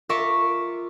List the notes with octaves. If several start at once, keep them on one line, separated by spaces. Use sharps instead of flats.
F4 A#4 E5 C#6 D6